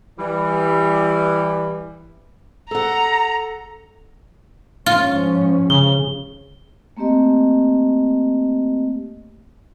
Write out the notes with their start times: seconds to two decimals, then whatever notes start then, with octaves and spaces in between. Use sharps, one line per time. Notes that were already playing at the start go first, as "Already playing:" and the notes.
0.19 E3 G3
2.71 A4 F#5 A#5
4.86 G#2 F3 C#4 F4
5.70 C#3 G7
6.97 A3 A#3 C4 G4 D#5